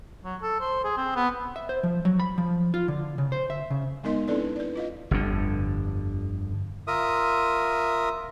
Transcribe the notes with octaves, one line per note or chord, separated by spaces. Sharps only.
F#3
A4
C5
G#4
C4
B3
E5
C5
F3
F#3
B5
F3
F4
D3
C#3
C5
E5
C#3
G#3 B3 D#4 A#4 D#5 C6
C4 D4 E4 A4 B4 D5
B4 D5
F4 D#5 F5
G1 F2 D3
F4 A#4 E5 D#6